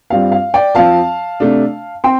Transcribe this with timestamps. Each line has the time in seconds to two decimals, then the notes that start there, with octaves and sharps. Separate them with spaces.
0.10 G2 G3 C4 F4 F5
0.32 F5
0.54 D5 G5
0.75 F2 F3 C4 F4 F5 A5
1.40 C3 A3 D4
2.04 C4 G5 C6